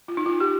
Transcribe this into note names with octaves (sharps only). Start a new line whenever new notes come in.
F4
D#4
F4
G4